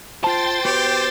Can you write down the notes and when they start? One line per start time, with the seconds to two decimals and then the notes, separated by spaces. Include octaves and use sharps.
0.24 F4 C5 G5 A5 C6 A6
0.65 B3 F#4 G4 B4